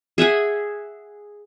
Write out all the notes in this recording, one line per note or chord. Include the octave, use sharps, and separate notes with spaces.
G#4 E5 F#5 G#5